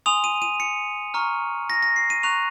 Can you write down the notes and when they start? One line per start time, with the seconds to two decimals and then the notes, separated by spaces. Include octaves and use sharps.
0.06 G#5 C6 D#6 F7
0.24 D#7
0.42 D#7
0.60 C#7
1.14 A#5 C#6 F6
1.70 A#6
1.83 A#6
1.96 C7
2.10 D#7
2.23 A#5 C#6 F#6 F7